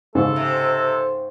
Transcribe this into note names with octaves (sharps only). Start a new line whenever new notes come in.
G#2 C#3 A4
C3